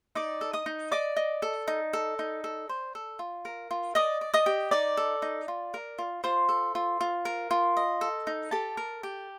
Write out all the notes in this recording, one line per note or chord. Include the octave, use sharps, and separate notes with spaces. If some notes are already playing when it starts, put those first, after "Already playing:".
D#4 D5 D6
A4
D#5 D#6
D#4
D5 D#5 D6
D#5
A4
D#4
A4
D#4
A4
C5
A4
F4
A#4
F4
D5 D#5 D#6
D5
D#5 D#6
G4
D#4 D5 D6
A4
D#4
F4
A#4
F4
F4 C5 C6
A4
F4
F4
A#4
F4
D#5
A4
D#4
G4 A4 A5
A#4
G4